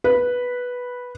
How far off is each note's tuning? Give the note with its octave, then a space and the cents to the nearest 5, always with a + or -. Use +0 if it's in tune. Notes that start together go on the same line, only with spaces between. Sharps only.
B4 -5